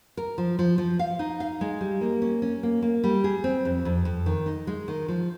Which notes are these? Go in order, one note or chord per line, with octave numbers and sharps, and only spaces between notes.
A#4
F3
F3
F3
F5
D#4
F5
G#3
G3
A#3
C#4
C#4
A#3
A#3
G3
G#4
C4
F2
F2
F2
D#3
D#4
G#3
D#3
F3